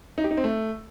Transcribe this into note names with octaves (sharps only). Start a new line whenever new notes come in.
D#4
G4
D#4
C4
A3